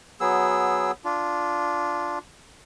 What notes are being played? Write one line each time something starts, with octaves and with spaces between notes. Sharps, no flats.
F#3 B3 G#4 E6
D4 F4